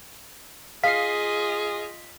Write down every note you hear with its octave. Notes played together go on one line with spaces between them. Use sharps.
F4 G#4 D#5 F5 B6 C7